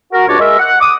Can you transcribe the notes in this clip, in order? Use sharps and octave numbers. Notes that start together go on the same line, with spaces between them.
F#4 A#4
C#2 G2 D4 F#4 C#5 D5
G#3 A#4 E5
F#5
D6 D#6